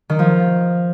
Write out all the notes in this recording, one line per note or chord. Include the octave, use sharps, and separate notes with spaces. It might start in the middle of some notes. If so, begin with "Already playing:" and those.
D#3
F3